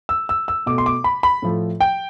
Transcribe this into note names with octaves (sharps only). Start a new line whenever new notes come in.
E6
E6
E6
B2 A3 D6
C6
D6
B5
B5
A2 F3 A3
G5